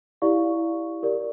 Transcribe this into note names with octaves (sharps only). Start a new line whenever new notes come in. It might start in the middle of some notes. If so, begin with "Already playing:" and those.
E4 G4 D5 F5 C#6
G4 A#4 D5